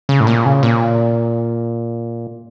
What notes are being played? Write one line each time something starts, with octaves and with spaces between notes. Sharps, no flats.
C#3
A2
A#2
C#3
A#2